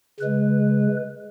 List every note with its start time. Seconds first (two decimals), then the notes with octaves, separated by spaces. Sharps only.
0.20 C#3 G#3 B4